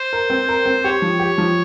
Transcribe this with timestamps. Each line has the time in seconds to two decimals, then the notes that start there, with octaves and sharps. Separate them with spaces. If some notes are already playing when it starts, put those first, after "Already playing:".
Already playing: C5
0.13 A#4
0.30 C4
0.49 A#4
0.66 C4
0.84 G4 C#5
1.02 F3
1.19 G4
1.38 F3